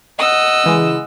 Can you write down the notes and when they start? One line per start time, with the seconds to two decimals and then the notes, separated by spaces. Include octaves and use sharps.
0.20 D#5 F#5 E6
0.64 C#3 E3 G#3